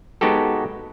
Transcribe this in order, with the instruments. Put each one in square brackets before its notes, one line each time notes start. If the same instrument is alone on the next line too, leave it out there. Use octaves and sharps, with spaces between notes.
[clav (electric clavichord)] G#3 B3 D#4 F#4 G4 A4